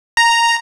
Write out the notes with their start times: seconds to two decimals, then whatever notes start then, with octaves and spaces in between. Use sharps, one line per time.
0.17 A#5